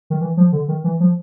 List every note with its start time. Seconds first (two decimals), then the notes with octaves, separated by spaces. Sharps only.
0.10 D#3
0.21 E3
0.37 F3
0.52 D3
0.68 D#3
0.84 E3
1.00 F3